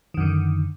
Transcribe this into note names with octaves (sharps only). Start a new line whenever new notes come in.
F#2 D3 D#3